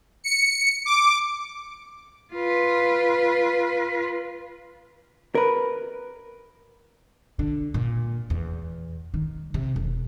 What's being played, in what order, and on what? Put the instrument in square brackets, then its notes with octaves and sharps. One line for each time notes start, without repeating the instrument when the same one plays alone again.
[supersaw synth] C#7
D6
[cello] F4 B4
[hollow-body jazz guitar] A#4 B4
[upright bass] D3
A#2
E2
D#3
C3
E1